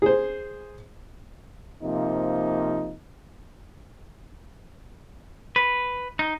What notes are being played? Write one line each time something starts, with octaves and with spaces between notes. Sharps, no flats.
G#4 C5
C3 F3 A#3 D#4
B4
D#4